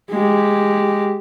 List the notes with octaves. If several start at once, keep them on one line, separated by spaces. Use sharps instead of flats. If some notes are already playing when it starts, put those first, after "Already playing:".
G#3 G4